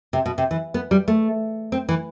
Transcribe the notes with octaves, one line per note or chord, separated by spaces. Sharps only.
C3
B2
C3
E3
B3
G3
A3
C4
E3